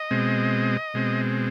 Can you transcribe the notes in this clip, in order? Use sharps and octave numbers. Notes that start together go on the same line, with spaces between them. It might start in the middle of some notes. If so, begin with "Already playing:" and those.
Already playing: D#5
B2 G#3 C4
B2 G#3 C4